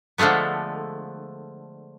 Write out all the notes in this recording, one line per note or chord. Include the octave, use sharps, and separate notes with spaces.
D3 F3 G#3 A3 B3